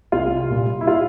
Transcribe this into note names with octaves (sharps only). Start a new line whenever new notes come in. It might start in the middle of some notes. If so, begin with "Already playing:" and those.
C2 F4
A#2 G3
E4
F4